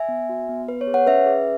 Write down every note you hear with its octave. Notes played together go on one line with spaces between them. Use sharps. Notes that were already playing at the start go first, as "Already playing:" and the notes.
Already playing: E5 G#5
B3
F#4
B3
B3 B4
C#5
G#4
C#5 F#5
C#4 B4 E5
G#4